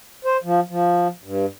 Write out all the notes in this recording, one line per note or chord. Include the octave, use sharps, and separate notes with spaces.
C5
F3
F3
G2